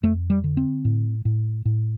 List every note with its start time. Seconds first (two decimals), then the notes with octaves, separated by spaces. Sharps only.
0.03 F2 A3
0.30 G3
0.44 D3
0.57 C4
0.85 A2
1.25 A2
1.65 A2